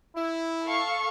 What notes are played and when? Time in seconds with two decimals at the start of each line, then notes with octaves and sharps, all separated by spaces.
0.15 E4
0.65 A4 F5 C#6